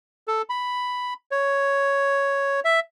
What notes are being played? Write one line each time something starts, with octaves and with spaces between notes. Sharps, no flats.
A4
B5
C#5
E5